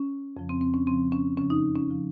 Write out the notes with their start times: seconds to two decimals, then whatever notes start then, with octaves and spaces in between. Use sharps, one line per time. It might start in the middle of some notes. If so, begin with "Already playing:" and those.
Already playing: C#4
0.37 F2 C#3 F3
0.49 C4
0.61 C4
0.74 C#4
0.87 F2 C#3 F3 C4
1.12 C#4
1.37 F#2 C#3 F3 C#4
1.50 D#4
1.75 C#4
1.90 C#3 F3